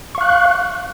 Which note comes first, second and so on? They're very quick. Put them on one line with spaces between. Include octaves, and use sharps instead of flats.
C#6 F5 F#6